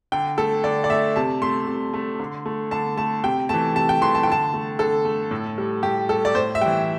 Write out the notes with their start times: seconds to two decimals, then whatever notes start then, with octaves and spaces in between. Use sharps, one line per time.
0.12 D3 G5
0.38 A3 A4
0.64 D3 D5
0.84 D5
0.90 A3 E5
1.16 C3 A5
1.42 A3 C6
1.67 C3
1.94 A3
2.20 D3
2.46 A3
2.71 D3 A5
2.97 A3 A5
3.24 C3 G5
3.49 E3 A3 A5
3.75 C3 A5
3.89 G5
4.01 E3 A3 C6
4.15 A5
4.23 G5
4.27 D3 A5
4.54 A3
4.79 D3 A4
5.05 A3
5.31 A2
5.58 G3
5.83 A2 G4
6.09 G3 A4
6.25 D5
6.35 A2 C5
6.55 E5
6.61 E3 G3 G5